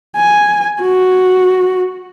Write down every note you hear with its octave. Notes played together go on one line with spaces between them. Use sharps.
G#5
F#4